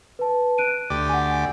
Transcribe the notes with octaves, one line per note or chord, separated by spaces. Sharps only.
B4 A5
F#6 D7 D#7
D2 G4 D5
F#5 G#5